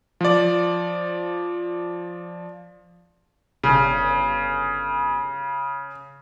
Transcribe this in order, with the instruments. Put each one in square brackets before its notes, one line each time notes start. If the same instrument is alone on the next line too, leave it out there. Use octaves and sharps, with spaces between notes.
[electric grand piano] F3 D5
[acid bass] G1 [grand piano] C#3